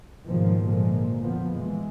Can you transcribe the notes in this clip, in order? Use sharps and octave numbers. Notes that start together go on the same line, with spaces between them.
G#2 B2 D#3 F3 F#3 A#3
A#2 D3 F3 G#3 A#3
F2 F3 B3
B2 E3 G#3